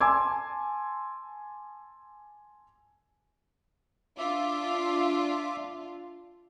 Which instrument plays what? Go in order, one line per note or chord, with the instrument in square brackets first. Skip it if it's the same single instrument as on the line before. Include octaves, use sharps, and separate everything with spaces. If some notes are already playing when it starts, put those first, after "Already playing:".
[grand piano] G#5 A5 C6 D6 E6 G#6
[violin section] D4 F4 [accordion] E5 D6